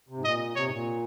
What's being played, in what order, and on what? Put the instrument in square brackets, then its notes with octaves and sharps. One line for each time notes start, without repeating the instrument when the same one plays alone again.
[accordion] C3
G#2
[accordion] A#2 [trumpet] D#5
[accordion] C3 [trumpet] C#5
[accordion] G#2
A#2